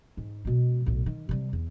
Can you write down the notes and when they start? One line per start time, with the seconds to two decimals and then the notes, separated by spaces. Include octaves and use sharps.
0.17 G#2
0.45 B2 G#3
0.86 B1 A2
1.06 D#3
1.29 C3 G3
1.53 E2